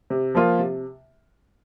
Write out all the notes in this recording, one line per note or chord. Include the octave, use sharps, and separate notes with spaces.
C3
F3 A#3 F4
C3